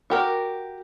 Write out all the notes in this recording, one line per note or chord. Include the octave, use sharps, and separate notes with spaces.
F#4 G4 A#4